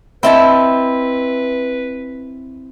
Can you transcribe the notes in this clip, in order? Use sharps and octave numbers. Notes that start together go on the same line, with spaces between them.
C4 E4 B4 D#5 E5 A5 B5